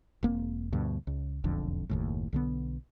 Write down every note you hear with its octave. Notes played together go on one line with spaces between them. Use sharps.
E1 A#3 C4
D2 G2 B2
C#2
E1 B1 F2 D3
F#1 D#2 A2
B1 D3 B3